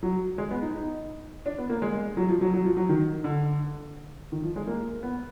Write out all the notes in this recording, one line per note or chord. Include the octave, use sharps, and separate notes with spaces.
F#3
G#3
B3
D#4
D#4
D4
B3
A#3
G#3
F#3
F3
F#3
F#3
F3
F#3
D#3
D3
D#3
F3
G#3
A#3
B3